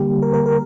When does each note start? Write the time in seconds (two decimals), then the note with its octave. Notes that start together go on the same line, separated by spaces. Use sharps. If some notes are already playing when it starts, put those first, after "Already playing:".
Already playing: D3 G3 A#3 G4
0.22 A#4
0.34 A#4
0.46 A#4